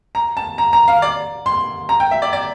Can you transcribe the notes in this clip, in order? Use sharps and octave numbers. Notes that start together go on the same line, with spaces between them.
A#5
A5
A#5
A#5
F5
D5
C6
A#5
G5
E5
D5
D5